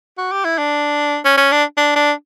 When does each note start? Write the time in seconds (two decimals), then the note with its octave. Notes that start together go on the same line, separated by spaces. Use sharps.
0.18 F#4
0.32 G4
0.45 E4
0.59 D4
1.25 C#4
1.37 C#4
1.52 D4
1.77 D4
1.96 D4